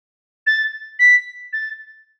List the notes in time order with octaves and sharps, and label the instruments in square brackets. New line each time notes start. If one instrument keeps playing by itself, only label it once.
[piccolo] A6
B6
A6